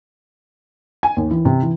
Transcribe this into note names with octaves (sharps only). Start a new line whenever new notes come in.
G#5
D#2
E3
C3
E3